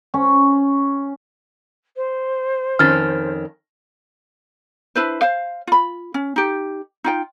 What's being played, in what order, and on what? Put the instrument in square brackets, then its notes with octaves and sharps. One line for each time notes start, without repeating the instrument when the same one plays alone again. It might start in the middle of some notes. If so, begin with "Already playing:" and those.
[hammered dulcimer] C#4
[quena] C5
[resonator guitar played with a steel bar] F2 D#3 C#4 [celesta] F6 A6
[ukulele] D4 E4 B4 C5
C5 F5
F4 B5
C#4
D#4 G4
D#4 F4 G5